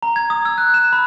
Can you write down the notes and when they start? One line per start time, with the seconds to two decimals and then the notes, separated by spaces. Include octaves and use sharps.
0.03 A#5
0.16 G#6
0.30 D#6
0.45 E6
0.58 F#6
0.74 E7
0.93 B5